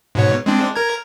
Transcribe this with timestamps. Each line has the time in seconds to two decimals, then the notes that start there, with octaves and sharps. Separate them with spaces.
0.15 G#2 B2 C#5
0.46 G#3 C4 D4
0.76 A#4 A#5 G#6